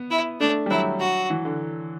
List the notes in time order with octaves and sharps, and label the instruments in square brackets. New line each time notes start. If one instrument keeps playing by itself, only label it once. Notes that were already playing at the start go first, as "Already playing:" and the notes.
Already playing: [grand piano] B3
[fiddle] E4
[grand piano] A3 [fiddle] D4
[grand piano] G3
[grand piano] F#3 [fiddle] E4
[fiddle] F#4
[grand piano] E3
D3